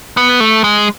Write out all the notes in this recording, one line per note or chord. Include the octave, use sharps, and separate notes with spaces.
B3
A3
G#3